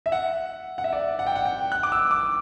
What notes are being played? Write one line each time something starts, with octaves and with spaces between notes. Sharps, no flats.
E5
F#5
F#5
E5
D5
F#5
G5
F#5
G5
F#6
D6
E6
D6